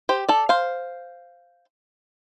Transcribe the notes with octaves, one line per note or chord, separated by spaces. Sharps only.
G4 C5
A4 D5
C5 F5